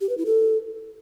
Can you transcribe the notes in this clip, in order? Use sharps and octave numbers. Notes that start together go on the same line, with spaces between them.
G4
B4
E4
A4